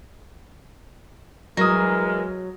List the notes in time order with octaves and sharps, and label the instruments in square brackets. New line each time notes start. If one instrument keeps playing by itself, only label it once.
[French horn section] E3 G#3 [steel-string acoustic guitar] F#3 [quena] A#4 [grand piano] D#6 A#6